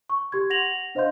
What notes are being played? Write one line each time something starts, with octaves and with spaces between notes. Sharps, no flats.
C#6
G4 C6 G#6
F#5 A#6 F7 F#7
D4 C5 D#5 F5 C6 G6